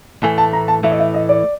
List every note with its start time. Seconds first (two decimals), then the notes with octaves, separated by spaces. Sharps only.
0.23 A2 E3 A3 G#5
0.38 A5
0.53 A#5
0.68 A5
0.83 A2 E3 A3 E5
0.91 D#5
0.99 E5
1.14 D#5
1.29 D5